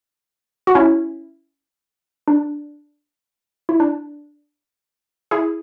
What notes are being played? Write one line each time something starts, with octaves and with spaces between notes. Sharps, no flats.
F#4
C#4 E4
D4
E4
D4
E4 G#4